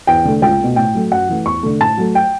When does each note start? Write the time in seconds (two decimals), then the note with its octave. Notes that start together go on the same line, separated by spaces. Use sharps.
0.07 E2 G5
0.25 D3 A3
0.42 C#2 G5
0.60 B2 A3
0.76 A2 G5
0.95 F#3 A3
1.12 F#2 F#5
1.29 E3 A3
1.46 E2 C#6
1.63 D3 A3
1.80 A2 A5
1.97 F#3 A3
2.15 G5